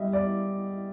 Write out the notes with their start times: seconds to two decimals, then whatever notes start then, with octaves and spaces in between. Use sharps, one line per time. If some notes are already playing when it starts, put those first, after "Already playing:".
Already playing: G3 D#5 E5
0.13 D5